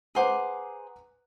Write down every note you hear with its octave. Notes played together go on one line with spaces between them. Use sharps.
G#4 B4 C5 F#5 A#5 D6